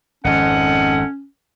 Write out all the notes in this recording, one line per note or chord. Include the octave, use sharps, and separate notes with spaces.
G#1 F2 C#4 A4 D#5 F#5